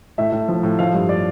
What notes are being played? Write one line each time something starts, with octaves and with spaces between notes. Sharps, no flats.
A2 E5
A2
F3
A2
F3 F5
G2
D5